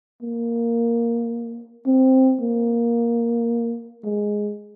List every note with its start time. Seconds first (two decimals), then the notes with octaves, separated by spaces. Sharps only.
0.22 A#3
1.86 C4
2.41 A#3
4.04 G#3